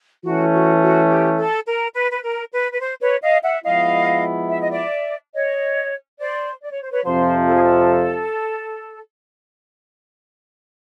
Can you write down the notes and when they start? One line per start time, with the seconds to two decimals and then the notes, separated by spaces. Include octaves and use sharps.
0.25 E3 A3 C#4 F#4
0.53 F#4
0.82 F#4
1.10 G4
1.38 A4
1.67 A#4
1.95 B4
2.12 B4
2.23 A#4
2.52 B4
2.72 B4
2.80 C5
3.01 B4 C#5
3.22 D#5 F5
3.43 E5 F#5
3.64 F3 G#3 B3 E4 D#5 F5
4.50 E5
4.60 D#5
4.71 D5 E5
5.34 C#5 D#5
6.19 C5 D5
6.62 D5
6.72 C#5
6.82 C5
6.93 B4 C#5
7.04 F2 C3 F3 C5
7.47 A4
7.55 G#4
7.63 A4